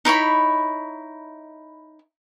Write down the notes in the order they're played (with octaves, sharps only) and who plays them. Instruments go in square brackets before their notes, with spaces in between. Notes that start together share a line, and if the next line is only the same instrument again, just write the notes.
[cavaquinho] D#4 E4 C#5 B5